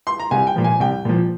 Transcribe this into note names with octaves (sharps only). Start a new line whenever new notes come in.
C6
A#5
C2 G#5
G5
A#2 F3
G#5
C2 G5
A#2 F3